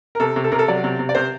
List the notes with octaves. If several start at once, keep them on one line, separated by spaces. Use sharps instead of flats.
A#4
C3 A4
C3
A4
C3 A#4
A4
F#3 D5
C3
C3
D5
C3 C5